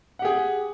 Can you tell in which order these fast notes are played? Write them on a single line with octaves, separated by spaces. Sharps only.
F#5 G4 G#4